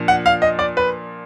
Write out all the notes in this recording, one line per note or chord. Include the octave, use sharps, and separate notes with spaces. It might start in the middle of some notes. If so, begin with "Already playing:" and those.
Already playing: A#2 F3 D4
F#5
F5
D#5
D5
B4